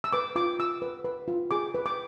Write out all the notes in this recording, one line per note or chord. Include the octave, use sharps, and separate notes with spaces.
E6
B4 D6
F4 D6
F4 E6
B4
B4
F4
G#4 D6
B4
D6